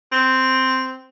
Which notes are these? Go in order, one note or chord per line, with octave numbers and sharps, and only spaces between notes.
C4